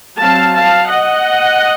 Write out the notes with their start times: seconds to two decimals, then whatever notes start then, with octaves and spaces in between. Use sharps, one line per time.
0.20 F#3 C4 F5 A5
0.54 F5 A5
0.88 D#5 F#5